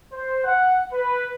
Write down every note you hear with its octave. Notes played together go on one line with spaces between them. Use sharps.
C5
F#5
B4